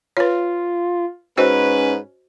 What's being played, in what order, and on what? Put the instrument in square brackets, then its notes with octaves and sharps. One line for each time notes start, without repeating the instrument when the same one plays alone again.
[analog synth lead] F4 [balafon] B4 C#5
[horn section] G#2 B4 [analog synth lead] C#4 [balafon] F#4 C5 D#5